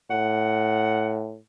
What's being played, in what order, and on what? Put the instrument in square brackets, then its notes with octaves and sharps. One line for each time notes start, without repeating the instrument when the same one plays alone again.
[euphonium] A2 [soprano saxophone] F#5